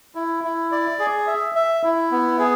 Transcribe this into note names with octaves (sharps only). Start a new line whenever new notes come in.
E4
E4
D5
G#4
E5
E5
E4
B3
G#4